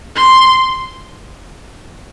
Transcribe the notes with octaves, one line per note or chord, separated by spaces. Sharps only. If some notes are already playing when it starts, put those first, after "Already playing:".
C6